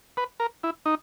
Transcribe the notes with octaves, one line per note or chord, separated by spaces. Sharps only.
B4
A#4
E4
D#4